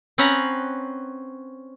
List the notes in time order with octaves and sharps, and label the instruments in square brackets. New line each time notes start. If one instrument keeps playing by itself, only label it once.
[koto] C4 C#4 B4 F#5 A#5